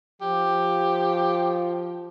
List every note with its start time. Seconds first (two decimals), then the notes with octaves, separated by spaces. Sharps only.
0.21 F3 G4